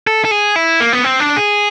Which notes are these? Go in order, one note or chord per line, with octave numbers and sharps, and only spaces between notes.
A4
A4
G#4
E4
A#3
B3
C4
D4
G#4